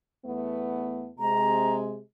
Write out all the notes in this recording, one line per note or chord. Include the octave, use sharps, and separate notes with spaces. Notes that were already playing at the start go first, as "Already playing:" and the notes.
E2 A3 B3
C3 G#3 A#5